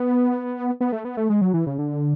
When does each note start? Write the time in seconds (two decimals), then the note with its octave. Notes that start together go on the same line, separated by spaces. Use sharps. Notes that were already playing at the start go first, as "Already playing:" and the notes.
Already playing: B3
0.80 B3
0.92 A3
1.05 B3
1.17 A3
1.30 G#3
1.41 F#3
1.54 E3
1.67 C#3
1.78 D3